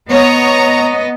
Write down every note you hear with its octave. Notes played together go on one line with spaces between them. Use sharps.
B3 C#5 D#5 A#5